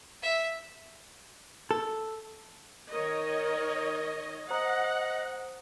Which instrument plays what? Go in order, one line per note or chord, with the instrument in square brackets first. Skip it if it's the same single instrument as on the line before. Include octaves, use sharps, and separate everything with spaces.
[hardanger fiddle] E5
[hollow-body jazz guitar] A4
[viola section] D#3 C#5 D#5 [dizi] A#4
[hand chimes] C5 A#5 D#6 [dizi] D#5 [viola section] F#5